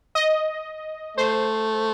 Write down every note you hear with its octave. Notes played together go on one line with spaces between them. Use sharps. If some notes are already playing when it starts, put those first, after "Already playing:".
D#5
A3 C5